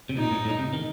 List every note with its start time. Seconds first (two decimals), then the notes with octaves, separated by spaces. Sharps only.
0.09 C3
0.17 A#2 D#4
0.31 A2
0.45 A2
0.59 C3
0.73 D#3